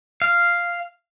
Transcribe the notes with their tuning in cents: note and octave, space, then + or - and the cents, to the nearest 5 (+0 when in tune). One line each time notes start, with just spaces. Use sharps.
F5 -5